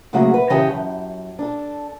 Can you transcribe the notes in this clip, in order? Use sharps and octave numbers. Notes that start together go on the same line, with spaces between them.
C#3 F#3 A3 A#3 F#4 G#4
B4
C#3 E3 G4 C#5 D#5 A5
F#2
D4 A4